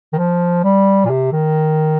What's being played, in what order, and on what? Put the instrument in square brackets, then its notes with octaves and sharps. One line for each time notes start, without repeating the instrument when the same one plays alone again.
[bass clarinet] D#3
F3
G3
A#2
C3
D#3